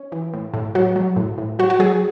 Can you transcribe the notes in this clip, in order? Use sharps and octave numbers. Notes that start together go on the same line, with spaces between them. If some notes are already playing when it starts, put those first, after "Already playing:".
Already playing: C#4
E3
A2
A2
F#3 F#4
F#3
A2
A2
F#3 F#4
F#4
F#3 G#4